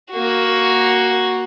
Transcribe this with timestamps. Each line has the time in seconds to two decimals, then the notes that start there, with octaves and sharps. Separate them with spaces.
0.11 A#3 F#4